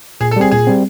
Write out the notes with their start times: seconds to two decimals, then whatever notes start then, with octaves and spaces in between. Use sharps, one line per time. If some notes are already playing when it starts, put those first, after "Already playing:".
0.21 A#2 G#4
0.31 A4
0.36 G3 C4 G#4
0.51 A#2 G#4
0.67 G3 C4